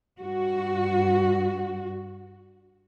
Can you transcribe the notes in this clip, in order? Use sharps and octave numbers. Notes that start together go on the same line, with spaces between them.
G2 F#4